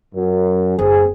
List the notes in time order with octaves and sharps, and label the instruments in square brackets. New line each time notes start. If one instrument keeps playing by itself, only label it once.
[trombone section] F#2
[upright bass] F#1 [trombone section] C4 G#4